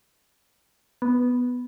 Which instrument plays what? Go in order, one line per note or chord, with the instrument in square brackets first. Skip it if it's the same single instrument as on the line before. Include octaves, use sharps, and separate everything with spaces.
[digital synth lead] B3